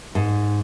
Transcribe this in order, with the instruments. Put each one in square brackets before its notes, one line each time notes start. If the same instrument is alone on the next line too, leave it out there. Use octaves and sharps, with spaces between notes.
[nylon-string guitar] G#2